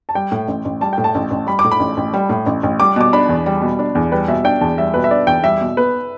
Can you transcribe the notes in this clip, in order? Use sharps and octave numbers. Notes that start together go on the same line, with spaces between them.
A5
G3 G5
A2
A1
A1
G3 A5
A2 G5
A5
A1
A1
G3 B5
D6
A2
B5
A1
A1
G3
A2
A1
A1
G3 D6
B2 D6
D4 B5
E2
G3
B2
D4
E2
G3 B4
B2 E5
D4 G5
E2 A5
G3 E5
B2 B4
E5
D4 D5
E2 G5
G3 E5
B2
B3 B4